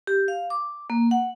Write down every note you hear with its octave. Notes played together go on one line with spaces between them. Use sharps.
G4
F5
D6
A#3
F#5